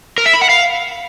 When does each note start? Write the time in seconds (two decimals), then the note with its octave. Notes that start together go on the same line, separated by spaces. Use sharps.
0.18 A#4
0.26 E5
0.34 B5
0.41 F#5
0.49 F5